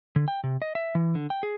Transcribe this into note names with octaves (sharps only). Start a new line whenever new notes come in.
D3
G5
C3
D#5
E5
E3
D3
G5
G#4